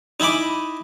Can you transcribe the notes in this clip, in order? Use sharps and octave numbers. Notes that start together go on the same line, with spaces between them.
D#4 E4 G#5 B5 D6